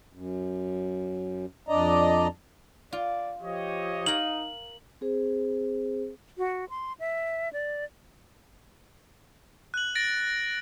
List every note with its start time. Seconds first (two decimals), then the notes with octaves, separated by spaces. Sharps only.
0.13 F#2
1.69 F2 D4 D5 D#5 A#5
2.93 F4 D5
3.42 F3 G4 C#5 D#5
4.06 D#4 A#4 F5 F#7
5.01 C4 G#4 C5
6.38 F#4
6.69 C6
7.00 E5
7.53 D5
9.74 F#6 F#7
9.95 A6 A#6 D7